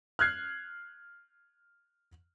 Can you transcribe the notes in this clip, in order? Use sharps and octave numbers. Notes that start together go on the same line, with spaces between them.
F6 F#6 G#6 C7